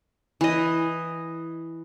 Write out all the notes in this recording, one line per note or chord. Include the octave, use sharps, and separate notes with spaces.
E3 D#5